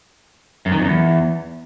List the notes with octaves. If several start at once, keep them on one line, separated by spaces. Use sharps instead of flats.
F#2
D#3
F2
E2